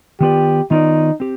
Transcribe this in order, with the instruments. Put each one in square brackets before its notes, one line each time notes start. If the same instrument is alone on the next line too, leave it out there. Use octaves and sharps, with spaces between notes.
[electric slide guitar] D#3 B3 F4 B4 D5 [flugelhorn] G4
[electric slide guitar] D#3 B3 F4 B4 D5 [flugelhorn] D#4
[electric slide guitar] C4 G4